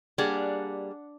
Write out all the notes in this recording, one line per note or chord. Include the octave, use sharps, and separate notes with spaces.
G3 A#3 D4 G#4 F#5